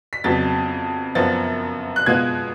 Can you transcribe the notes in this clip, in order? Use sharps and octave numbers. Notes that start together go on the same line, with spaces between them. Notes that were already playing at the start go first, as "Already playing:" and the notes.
B6
F2 C#3 F#3 B3 A6
F#2 F3 B3 A6
F#6
B2 G#3 B3 F4 G#6